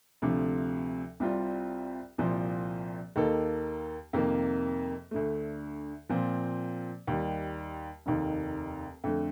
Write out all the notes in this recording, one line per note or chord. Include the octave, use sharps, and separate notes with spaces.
D2 C3 F3 A3
C2 C3 G3 C4 F4
C2 A#2 F3 C4
D#2 D#3 A#3 D#4 A4
F2 C3 D#3 A#3
D2 D3 A3
A#2 F3 C4
D#2 D#3 G3
F1 D#2 D#3
F2 D3 A3